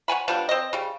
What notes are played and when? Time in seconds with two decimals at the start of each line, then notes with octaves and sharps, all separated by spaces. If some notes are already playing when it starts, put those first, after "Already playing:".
0.08 C#5 F#5 G#5 B5
0.28 F3 G3 B3 D4
0.49 C4 D#5
0.73 C#3 G3